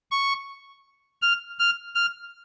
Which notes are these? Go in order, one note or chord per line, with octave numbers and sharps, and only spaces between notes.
C#6
F6
F6
F6